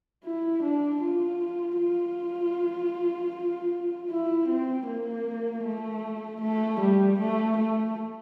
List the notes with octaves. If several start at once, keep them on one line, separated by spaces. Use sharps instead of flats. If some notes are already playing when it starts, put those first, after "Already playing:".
E4
D4
F4
F4
E4
C4
A#3
A3
A3
G3
A3
A3